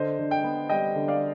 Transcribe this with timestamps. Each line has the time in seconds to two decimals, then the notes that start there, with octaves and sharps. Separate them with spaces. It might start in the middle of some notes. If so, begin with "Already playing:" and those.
Already playing: D3 C5 D#5
0.19 D3
0.31 D#5 G5
0.44 B3
0.69 G3 D#5 G5
0.95 D3
1.08 D5 F5